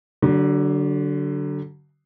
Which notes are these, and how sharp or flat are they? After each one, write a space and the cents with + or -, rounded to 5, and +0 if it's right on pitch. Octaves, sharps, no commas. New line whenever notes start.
D3 +0 F#3 +40